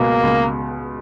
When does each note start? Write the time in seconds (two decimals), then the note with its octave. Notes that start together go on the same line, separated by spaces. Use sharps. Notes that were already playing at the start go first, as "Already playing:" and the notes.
Already playing: C#2 B2 A#3
0.23 C#2